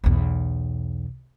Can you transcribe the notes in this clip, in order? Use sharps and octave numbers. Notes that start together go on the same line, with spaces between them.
B1 E2